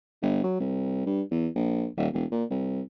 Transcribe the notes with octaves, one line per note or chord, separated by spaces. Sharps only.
G1
F#3
C2
G2
E2
A#1
D#1
E1
A#2
C2